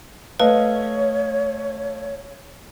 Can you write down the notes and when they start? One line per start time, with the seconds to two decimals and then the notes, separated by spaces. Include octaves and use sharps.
0.40 A3 B4 C#5 D#5 F5